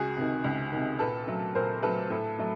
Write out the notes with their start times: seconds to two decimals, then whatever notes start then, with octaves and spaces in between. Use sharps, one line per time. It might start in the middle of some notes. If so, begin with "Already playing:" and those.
Already playing: C#2 F#4 G#4
0.16 C3 D#3
0.44 C#2
0.72 C3 D#3
0.99 A#2 A4 B4
1.27 F#3 A3
1.55 A#2 A#4 C5
1.82 F#3 A3 A4 B4
2.10 A2
2.38 F#3 A3